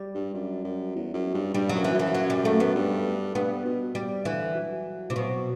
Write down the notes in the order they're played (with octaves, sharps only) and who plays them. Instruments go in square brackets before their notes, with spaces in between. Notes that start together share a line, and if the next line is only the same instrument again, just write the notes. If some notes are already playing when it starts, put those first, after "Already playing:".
Already playing: [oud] G3
[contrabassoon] G2
F#2
F#2
E2
F#2
G2
[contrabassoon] G2 [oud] G3
[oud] F#3
[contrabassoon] F#2
[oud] E3
[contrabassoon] F#2
[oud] E3
F#3
G3
A3
B3
[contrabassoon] G2
[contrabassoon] G2 [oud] B3
[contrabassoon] B2
[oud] G3
[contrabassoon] D3 [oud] E3
[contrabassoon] F#3
[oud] C3 [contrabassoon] E3
[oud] B2 [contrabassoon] F#3